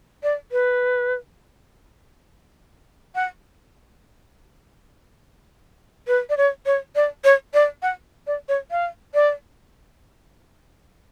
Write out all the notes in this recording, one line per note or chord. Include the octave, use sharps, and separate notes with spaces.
D5
B4
F#5
B4
D5
C#5
C#5
D5
C#5
D5
F#5
D5
C#5
F5
D5